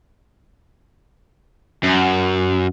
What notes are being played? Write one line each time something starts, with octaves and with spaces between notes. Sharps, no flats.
F#2